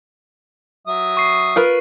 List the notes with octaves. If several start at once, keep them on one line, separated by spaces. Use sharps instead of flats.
F#3 E5 D#6
C#6 C7
F4 A#4 B4